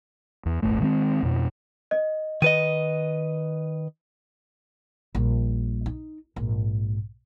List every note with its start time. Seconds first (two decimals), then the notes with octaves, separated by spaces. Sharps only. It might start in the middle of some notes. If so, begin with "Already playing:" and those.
0.46 E2
0.62 D#1 G#1 A3
0.81 D#3 G#3 A#3 C4
1.23 F2 B2
1.91 D#5
2.42 D#3 B4 D#5 D#7
5.15 A#1 G3
5.86 D#4
6.36 A#1 G#2